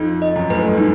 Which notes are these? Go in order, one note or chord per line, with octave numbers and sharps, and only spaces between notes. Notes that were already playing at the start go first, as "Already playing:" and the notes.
Already playing: F2 D#4
D#5
F#2
A2 B4
G#2
G2
D#4